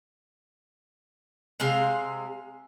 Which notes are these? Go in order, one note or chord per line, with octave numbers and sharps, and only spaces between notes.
C3 G#3 F5